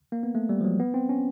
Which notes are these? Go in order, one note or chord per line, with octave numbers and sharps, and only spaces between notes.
A#3
B3
A3
G3
F3
F#3
B3
C4
C#4